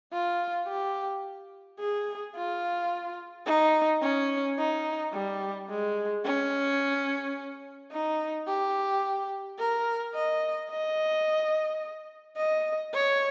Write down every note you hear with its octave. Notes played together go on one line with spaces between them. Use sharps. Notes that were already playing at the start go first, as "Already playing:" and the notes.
F4
G4
G#4
F4
D#4
C#4
D#4
G3
G#3
C#4
D#4
G4
A#4
D#5
D#5
D#5
C#5